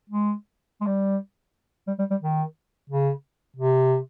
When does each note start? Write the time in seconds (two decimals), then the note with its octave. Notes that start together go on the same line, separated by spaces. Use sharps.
0.10 G#3
0.81 G#3
0.86 G3
1.87 G3
1.99 G3
2.10 G3
2.22 D#3
2.90 C#3
3.56 C3